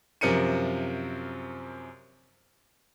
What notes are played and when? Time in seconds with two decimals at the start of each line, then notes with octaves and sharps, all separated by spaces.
0.21 F#2 C3 F3 A#4 C#7 D#7